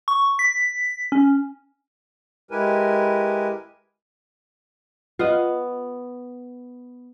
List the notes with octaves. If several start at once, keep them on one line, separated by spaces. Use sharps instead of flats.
C#6
B6
C#4
G#3 E4 G4 A#4 B4 G#5
B3 F4 D#5